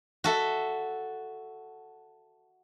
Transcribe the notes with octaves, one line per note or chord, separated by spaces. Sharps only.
F#4 A4 E5